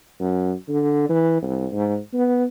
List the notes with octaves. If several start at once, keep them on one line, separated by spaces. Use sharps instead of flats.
F#2
D3
E3
C2
G#2
B3